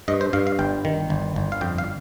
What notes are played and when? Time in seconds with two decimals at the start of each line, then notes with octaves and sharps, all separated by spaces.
0.08 G2 D#5
0.21 C5
0.33 G2 F5
0.47 F5
0.59 G1 G5
0.85 D#3
1.10 G1
1.36 G1
1.52 F5
1.61 F2 G5
1.78 F5